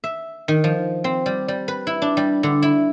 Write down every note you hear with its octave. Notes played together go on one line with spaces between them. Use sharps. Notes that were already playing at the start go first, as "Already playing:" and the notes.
E5
D#3
F3
C4
G3
G3
B4
E4
D4
G3
D3
E4